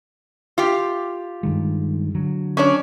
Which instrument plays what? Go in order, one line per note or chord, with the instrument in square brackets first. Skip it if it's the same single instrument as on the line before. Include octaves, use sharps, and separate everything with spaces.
[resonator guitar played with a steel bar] F4 G4
[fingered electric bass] G2 D#3 G#3
D3 F#3
[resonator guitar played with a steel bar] C#4 D4 C#5